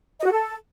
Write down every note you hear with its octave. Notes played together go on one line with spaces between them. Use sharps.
D#5
F#4
A4